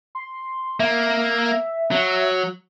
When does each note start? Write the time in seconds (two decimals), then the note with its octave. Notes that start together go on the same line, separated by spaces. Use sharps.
0.15 C6
0.80 A#3 E5
1.91 F#3